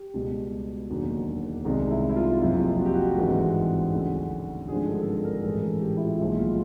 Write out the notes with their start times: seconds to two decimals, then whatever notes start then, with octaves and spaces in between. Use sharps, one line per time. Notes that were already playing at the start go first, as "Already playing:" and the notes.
Already playing: G4
0.14 C#2 B2 G3
0.89 E1 D#2 D3 F#3
1.65 C2 C3 D#3 G#3
1.91 E4
2.09 E4
2.16 F4
2.41 F#1 F2 C3 F3 F4
2.78 F#4
2.85 G4
2.94 F#4
3.16 G#1 G2 E3 G#3
3.92 D2 C#3 F#3
4.68 G#1 G2 D3 F3 G#3 G#4
4.87 A4
5.02 A4
5.06 A#4
5.25 A#4
5.44 A1 G#2 E3 G#3 A4
5.63 G#4
5.81 G4
5.97 E4
6.01 F4
6.19 B1 A#2 F3 G#3 E4
6.39 F4